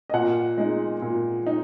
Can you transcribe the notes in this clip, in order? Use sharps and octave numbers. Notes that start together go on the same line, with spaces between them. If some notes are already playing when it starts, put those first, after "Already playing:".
D#5
A#2 F#5
G#3 D#4
A#2
D#4